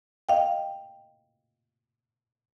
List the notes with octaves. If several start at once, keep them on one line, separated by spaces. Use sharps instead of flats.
D#5 F5 G5